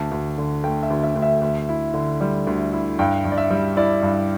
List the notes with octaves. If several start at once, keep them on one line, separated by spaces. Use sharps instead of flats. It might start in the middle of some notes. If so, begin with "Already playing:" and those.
Already playing: D2 A5
D2
D3
A3 G5
E5
D2
E5
D2
E5
D2
E4
D3
G3
D2
E4
G2 G5
G2
D5
E5
G3
E4 D5
G2